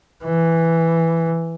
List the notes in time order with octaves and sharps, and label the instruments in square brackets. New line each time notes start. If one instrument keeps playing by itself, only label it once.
[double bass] E3